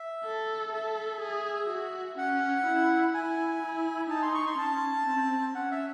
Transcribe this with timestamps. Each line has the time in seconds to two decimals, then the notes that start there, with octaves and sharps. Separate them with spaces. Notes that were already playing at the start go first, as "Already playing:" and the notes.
Already playing: E5
0.25 A4
0.73 A4 E5
1.21 G#4
1.70 F#4
2.18 C#4 F#5
2.66 E4
3.13 E4 G#5
3.63 E4
4.10 D#4 A5
4.22 C6
4.35 C#6
4.47 C6
4.58 C#4 A5
5.07 C4
5.55 C#4 F#5
5.71 E5